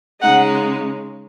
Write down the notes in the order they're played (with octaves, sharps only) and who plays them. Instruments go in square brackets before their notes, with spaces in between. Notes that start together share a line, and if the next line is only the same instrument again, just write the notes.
[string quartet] C#3 G#3 D#4 [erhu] F#5